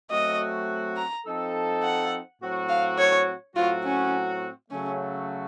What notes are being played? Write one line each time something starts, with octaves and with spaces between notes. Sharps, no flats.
F#3 A3 C4 F#4 D#5
A#5
F3 C4 D#4 A4
F#5
A2 F#3 C4 F#4
F5
C#5
A2 F#3 C4 F4 F#4
C#4
C#3 F#3 A3 C#4